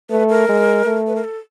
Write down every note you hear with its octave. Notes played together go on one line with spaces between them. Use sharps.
A3 B4
A#4
G#3
A3
B4
A#4
A4